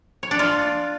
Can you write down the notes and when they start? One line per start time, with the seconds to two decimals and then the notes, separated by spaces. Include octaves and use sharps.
0.23 C#5
0.31 D4
0.39 F4